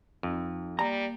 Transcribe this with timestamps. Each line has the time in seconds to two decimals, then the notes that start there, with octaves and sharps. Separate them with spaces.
0.23 F2 D#4
0.79 G3 A#3 A#5